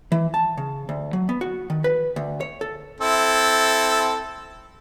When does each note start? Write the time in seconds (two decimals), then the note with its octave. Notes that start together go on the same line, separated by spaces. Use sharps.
0.12 E3
0.34 A5
0.57 C#3
0.89 D2
1.13 F#3
1.29 B3
1.41 F#4
1.70 D#3
1.84 B4
2.16 D2
2.41 C#5
2.61 A4
3.00 C4 E4 A4